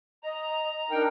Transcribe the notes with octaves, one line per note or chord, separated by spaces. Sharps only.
D#5 A#5
D4 D#4 A#4 G5